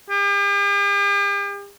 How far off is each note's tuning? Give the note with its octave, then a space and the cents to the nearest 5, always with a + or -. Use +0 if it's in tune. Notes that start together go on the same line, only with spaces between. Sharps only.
G4 +45